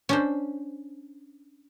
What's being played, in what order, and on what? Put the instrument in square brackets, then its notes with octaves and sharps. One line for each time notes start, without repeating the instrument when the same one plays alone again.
[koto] C#4 D4 C5